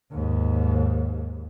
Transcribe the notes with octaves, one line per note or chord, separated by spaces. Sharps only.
D#2 G#2